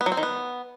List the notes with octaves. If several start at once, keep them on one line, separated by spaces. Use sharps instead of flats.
B3
F#3
C4
D#3
B3